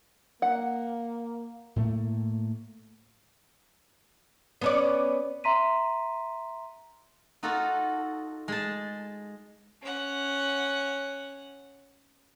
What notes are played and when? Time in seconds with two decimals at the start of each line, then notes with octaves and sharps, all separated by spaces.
0.42 A#3 F#5
1.76 A2 A3 A#3
4.61 B3 C#4 D5
5.44 E5 A#5 C6 B6 D#7
7.43 D#4 F4 F#4 A4
8.48 G#3 A5
9.82 C#4 F#5